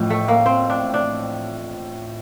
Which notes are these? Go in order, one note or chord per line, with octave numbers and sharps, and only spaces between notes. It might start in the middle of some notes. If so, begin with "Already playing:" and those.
Already playing: A1 A2 F3
A3
A#3
C4
D4
D4